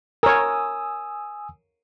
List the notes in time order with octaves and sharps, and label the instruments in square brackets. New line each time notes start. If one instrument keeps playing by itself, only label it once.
[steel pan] A#4 C#5 [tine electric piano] G#5 D#6 E6